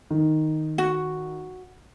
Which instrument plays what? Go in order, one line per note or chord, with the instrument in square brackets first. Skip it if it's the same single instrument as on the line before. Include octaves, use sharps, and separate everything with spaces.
[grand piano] D#3
[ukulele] F#4